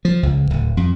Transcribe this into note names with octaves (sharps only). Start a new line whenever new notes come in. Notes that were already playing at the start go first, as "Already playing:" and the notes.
F3
C#2
D1
F2